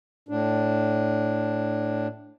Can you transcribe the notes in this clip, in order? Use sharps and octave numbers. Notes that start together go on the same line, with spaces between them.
A2 D4